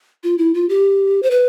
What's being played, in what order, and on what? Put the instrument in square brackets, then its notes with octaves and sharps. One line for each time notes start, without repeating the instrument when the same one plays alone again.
[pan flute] F4
E4
F4
G4
C5
B4